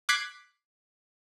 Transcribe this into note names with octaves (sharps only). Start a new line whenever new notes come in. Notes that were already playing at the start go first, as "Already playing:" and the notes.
D6 F#6 G#6 B6 C7 D7